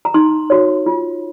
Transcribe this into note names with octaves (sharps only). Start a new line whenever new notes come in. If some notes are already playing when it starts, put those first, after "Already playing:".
A#5
D#4 C6
F#4 C#5
F4